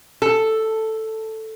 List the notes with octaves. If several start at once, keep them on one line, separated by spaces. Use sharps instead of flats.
A4